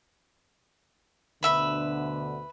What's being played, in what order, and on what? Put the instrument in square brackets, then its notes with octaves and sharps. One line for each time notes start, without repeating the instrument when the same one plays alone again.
[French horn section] D2 B2 D3 [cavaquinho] B4 E5 B5